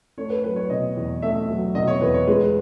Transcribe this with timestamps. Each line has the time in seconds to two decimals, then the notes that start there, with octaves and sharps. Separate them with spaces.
0.18 A3 C#5
0.30 B4
0.44 F#3 B4
0.56 C#5
0.70 B2 D#5
0.96 E2
1.22 A3 E5
1.49 F#3
1.75 B2 D#5
1.87 C#5
2.01 E2 B4
2.14 C#5
2.27 G#3 B4